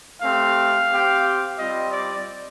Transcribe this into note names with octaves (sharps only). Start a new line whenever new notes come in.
A3 C4 G4 F5
C4 G4
G3 C4 F4 D#5
D5